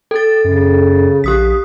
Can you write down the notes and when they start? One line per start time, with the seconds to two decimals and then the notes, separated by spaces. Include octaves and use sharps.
0.11 A4 A6
0.44 F#2 C#3
1.24 A#1 G4 D#6 B6